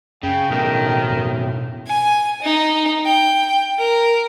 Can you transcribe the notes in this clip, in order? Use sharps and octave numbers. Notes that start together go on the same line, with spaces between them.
F#2 C#3 G5
B1 A2 D#3
G#5
D#4
G5
A#4